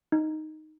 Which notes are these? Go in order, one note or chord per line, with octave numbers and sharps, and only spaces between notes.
D#4